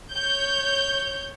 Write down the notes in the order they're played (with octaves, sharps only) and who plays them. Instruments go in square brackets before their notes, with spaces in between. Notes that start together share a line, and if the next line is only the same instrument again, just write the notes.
[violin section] C#5 G6